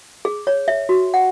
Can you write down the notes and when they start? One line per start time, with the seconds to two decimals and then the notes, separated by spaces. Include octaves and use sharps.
0.25 G#4
0.47 C#5
0.68 E5
0.89 F#4
1.14 F#5